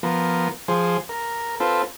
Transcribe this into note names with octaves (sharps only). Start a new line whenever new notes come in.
F3 B3 A#4
F3 G#4 C5
A#4
C4 F4 A4 B4